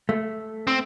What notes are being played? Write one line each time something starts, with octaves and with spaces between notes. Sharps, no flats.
A3
C4